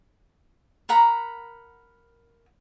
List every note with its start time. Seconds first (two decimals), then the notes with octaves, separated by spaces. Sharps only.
0.89 A#4 F#5 A#5 B5